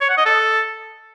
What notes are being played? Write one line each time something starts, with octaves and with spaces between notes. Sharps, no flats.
C#5
F#5
D#5
A4